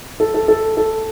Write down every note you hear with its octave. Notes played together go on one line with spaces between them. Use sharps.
A4
A4
A4
A4